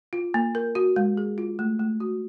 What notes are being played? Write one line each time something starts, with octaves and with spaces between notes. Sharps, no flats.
F4
A#3
A#4
F#4
G#3
G#4
F4
A3
A3
F#4